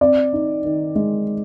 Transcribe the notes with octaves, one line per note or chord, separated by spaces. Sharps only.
C4 D5
D#4
D#3
G#3